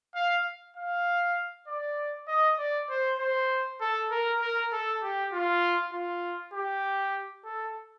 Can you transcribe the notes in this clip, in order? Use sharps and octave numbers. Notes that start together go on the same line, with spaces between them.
F5
F5
D5
D#5
D5
C5
C5
A4
A#4
A#4
A4
G4
F4
F4
G4
A4